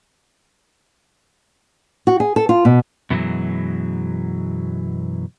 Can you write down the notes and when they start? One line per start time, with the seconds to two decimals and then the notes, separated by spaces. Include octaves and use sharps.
2.07 F#4
2.20 G#4
2.36 A4
2.49 F4
2.65 B2
3.10 F#2 B2 E3 F#3 G#3